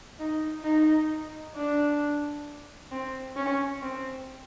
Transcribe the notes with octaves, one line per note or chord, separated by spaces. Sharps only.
D#4
D#4
D4
C4
C#4
C4